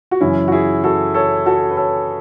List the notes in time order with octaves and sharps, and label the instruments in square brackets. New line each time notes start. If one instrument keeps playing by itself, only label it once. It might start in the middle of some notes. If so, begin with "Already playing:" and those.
[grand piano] F#4
F#2 C#3 E3 C#4 E4
F#4
E4 G#4
F#4 A4
A4 C#5
F#4 A4
B4
A4 C#5